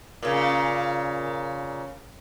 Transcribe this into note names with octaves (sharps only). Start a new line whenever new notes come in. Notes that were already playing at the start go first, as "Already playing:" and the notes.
A#2 C#3